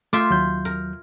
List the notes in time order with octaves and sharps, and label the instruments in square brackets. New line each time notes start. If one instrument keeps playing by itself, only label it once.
[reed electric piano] A3 D6 [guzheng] F4 E5 G5
[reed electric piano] D#2 F#3 G6
[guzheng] A#4